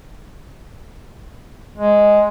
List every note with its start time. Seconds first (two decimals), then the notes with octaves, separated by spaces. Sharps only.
1.77 G#3